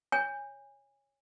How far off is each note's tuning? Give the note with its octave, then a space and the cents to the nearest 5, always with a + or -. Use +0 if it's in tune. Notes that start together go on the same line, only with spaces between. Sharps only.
C#5 +0 G#5 -20